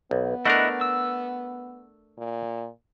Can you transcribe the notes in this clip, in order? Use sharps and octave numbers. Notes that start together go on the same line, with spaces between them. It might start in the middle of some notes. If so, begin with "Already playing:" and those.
B1 B3
A3 D4 E4 A#4 D#5 F#5
E6
A#2